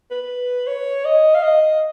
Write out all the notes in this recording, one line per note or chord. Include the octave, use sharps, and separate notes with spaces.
B4
C#5
D#5
F5
D#5